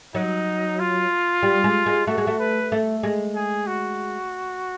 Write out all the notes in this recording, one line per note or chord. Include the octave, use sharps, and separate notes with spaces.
F#3 D#4
F4
G3
G#3
G#3
A3 F#4
G#3
A3
B4
A3
G#3
G#4
F#4